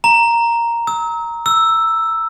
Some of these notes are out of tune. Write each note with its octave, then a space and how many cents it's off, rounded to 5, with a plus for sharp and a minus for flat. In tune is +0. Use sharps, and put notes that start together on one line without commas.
A#5 +0
E6 -40
E6 +5